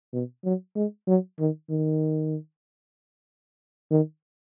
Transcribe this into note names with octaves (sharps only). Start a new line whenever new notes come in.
B2
F#3
G#3
F#3
D#3
D#3
D#3